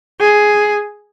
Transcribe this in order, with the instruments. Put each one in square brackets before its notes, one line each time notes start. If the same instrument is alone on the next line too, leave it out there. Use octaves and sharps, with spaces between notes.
[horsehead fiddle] G#4